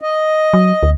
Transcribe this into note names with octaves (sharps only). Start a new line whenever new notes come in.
D#5
F#3
D2